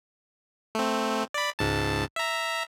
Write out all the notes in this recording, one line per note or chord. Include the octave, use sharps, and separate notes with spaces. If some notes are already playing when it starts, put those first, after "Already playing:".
A3 C4
D5 B5
C#2 G#2 A5
E5 A#5